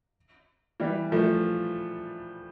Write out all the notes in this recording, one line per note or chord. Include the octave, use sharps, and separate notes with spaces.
E3 G3
F3 A3